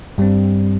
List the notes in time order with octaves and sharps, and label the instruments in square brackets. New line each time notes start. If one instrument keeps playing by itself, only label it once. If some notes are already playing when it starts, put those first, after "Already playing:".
[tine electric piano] G2 G3 C4